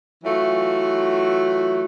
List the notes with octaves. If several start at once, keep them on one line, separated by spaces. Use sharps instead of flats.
E3 F#3 A3 F4 F#4